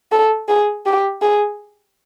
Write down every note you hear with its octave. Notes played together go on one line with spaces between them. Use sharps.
A4
G#4
G4
G#4